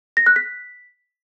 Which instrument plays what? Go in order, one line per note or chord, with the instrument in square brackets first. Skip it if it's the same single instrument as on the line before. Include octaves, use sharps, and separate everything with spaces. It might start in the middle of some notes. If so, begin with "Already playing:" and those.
[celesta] A#6
F#6
B6